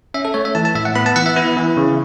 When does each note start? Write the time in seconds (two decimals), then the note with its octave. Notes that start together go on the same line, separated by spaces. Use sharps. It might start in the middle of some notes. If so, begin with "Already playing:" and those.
0.14 C#4 E5
0.25 A4
0.34 A3 C#5
0.45 E5
0.55 E3 A5
0.65 A5
0.75 A2 E5
0.85 F#5
0.95 B3 B5
1.06 A5
1.16 E3 F#5
1.26 E5
1.36 B3 E4
1.56 E3
1.77 C#3